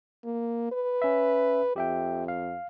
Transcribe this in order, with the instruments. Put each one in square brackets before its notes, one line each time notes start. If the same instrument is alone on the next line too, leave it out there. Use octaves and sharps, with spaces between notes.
[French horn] A#3
B4
[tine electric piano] C#4 E5
[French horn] F2 [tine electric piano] G4 E5 G5
[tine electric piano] F5